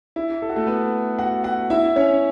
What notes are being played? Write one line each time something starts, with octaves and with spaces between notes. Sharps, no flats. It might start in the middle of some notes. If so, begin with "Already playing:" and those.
E4
A4
F#4
A3 A4
B3 B4
F#4 F#5
F#4 F#5
E4 E5
C#4 C#5